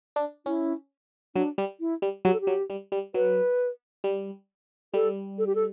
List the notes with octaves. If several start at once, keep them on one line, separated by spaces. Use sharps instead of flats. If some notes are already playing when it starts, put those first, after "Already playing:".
D4
C#4 E4
F#3 D4
G3
E4
G3
F#3 G4
A4
G4
F#3
G3
G3
F#3 B4
G3
G3 A4
A4
G4
A4